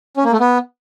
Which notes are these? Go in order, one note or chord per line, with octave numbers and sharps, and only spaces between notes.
C#4
A#3
A3
B3